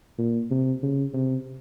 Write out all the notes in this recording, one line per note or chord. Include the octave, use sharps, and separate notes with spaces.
A#2
C3
C#3
C3